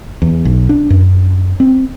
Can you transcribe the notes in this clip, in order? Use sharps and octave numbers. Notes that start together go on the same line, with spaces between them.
E2
B1
D4
F#2
C4